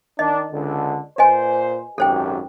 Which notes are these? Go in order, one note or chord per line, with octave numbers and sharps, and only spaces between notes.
D#3 D4 D#5
C#2 D3
A#2 B4 C5 D#5 G#5
G#1 F#2 G4 A4 C5 G5